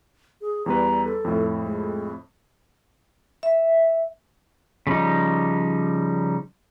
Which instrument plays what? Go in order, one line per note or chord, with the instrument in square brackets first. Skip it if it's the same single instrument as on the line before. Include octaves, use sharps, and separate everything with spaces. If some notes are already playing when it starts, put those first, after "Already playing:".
[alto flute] G#4
[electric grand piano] E2 G3 B4 [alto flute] A#5
[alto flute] A4
[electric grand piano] F2 A2
[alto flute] G#3
[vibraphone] E5
[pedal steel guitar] C#3 F3 G3 D#4